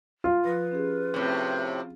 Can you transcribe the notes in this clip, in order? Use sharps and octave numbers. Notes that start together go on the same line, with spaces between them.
F4
F3 B4 A#6
C#4 G4 G#4
A2 C3 C4